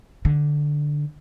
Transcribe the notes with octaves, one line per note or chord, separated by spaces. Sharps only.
D3